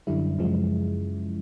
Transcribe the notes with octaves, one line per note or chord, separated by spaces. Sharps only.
F#2 D3 G3 E4
F#2 C#3 F3 G#3